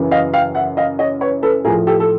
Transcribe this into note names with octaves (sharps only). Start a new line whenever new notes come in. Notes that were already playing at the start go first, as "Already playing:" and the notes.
Already playing: F#2 C#3 E3
D#5 F5
F5 G5
E5 F#5
D#5 F5
C#5 D#5
B4 C#5
A4 B4
A2 F3 G#4 A#4
G4 A4
A4